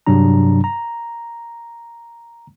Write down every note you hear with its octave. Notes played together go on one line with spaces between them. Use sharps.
G2 C3 F#3 D4 A#5
A#5